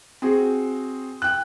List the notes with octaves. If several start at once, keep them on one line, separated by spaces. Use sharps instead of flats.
C4 F#4 G#4
G5 F#6